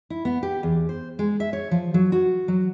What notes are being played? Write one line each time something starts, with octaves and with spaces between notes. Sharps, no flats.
E4
B3
G4
E2
C5
G#3
E5
C#5
F3
F#3
F#4
F#3